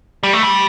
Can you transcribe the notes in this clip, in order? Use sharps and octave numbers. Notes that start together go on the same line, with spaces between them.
G3
A3
G3